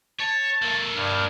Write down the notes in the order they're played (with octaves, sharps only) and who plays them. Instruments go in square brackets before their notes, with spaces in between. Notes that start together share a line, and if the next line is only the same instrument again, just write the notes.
[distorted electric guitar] C#5 [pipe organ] A5
[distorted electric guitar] A#3 A4
[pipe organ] G2 F6